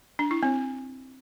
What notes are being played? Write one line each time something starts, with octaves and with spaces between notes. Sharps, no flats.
D4
E4
C4